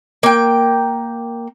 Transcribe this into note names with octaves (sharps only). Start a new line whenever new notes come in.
A#3 G5